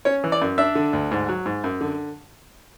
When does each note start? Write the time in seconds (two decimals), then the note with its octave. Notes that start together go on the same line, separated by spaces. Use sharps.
0.05 C#4 C#5
0.24 E3
0.32 D5
0.41 F#2
0.58 D4 E5
0.75 D3
0.93 D2
1.11 G#2
1.29 F#3
1.46 G#2
1.64 F#2
1.81 D3